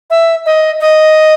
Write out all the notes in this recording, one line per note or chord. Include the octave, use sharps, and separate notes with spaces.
E5
D#5
D#5